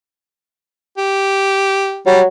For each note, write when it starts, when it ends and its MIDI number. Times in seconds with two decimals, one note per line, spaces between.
0.97 2.01 67
2.06 2.26 54
2.06 2.20 55